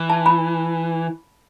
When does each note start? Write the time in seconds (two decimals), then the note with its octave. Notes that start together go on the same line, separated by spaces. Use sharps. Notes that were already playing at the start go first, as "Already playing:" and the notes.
Already playing: E3
0.10 A5
0.26 B5